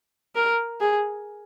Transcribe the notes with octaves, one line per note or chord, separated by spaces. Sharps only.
A#4
G#4